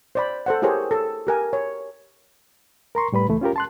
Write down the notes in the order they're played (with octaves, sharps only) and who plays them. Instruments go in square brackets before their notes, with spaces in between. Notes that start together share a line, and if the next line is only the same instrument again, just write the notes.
[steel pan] C5 D5 B5
A4 C5 F#5
E4 G4 G#4 A#4 C5 C#5
A4
G4 A#4 G#5
C#5
[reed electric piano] A#4 A#5 C6 C#6
A2 G3 B4 B5
C#2 E3 A3
C#4 F4 G4 A#4
A5 C6 F#6